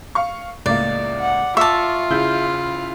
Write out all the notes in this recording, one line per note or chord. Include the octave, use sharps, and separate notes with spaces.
F5 C#6
C#2 A2 A#3 D5
F#5
F4 E5 A5 C#6 D6
C#3 E4 G6